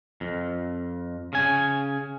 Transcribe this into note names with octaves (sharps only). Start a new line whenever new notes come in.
F2
C#3 G#5